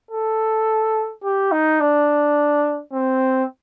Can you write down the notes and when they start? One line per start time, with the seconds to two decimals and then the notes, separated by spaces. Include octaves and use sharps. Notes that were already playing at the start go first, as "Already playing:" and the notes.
0.11 A4
1.24 G4
1.52 D#4
1.80 D4
2.93 C4